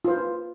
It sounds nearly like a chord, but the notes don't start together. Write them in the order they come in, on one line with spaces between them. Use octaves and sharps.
F4 C5 B4